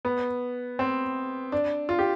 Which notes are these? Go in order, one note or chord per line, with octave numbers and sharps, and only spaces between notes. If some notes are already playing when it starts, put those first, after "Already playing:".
B3
C4
D4
F4
G4